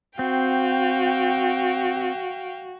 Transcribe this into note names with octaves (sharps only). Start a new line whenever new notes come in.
C4 F#4 F5 G5